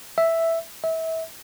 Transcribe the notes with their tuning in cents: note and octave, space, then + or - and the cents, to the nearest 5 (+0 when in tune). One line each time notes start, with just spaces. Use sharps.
E5 +0
E5 -30